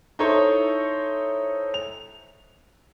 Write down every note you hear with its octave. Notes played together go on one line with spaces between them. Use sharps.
D#4 E4 A4 C5 C#5
F7